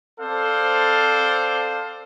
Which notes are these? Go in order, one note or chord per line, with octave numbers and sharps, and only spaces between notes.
C4 A4 C5 D5 F5